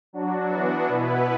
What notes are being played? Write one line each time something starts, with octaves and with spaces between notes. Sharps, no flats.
F#3 D4 F#4
E3 B3 D4 F#4
B2 B3 E4 B4